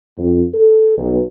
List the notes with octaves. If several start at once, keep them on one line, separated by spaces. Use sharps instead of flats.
F2
A4
B1